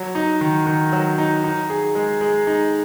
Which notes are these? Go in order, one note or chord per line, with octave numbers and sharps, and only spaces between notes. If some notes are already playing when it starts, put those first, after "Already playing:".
Already playing: F#3
D#4
D#3
D#3
F#3
D#4
D#4
G#4
G#3
G#3
D#4